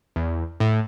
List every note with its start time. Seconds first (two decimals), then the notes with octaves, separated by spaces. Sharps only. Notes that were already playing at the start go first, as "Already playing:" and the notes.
0.16 E2
0.60 A2